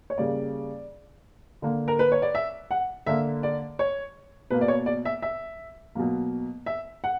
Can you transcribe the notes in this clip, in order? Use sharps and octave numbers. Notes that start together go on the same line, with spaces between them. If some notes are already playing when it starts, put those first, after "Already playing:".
C#5
C#3 G3 A#3 D5
D3 A#3
A#4
B4
C#5
D5
E5
F#5
D3 A#3 E5
D5
C#5
B2 A#3 B4
D5
C#5
D5
E5
E5
B2 F#3 A#3
E5
F#5